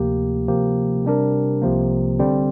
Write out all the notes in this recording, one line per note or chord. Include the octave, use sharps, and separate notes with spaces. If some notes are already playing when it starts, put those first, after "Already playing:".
Already playing: D2 C3 F3 A#3 G4
C3 F3 A#3 G4
C3 G3 D4 A#4
C2 C3 F3 A#3
D3 G3 C4